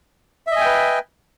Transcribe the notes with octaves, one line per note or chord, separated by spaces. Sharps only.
B4 D#5 E5 G5 G#5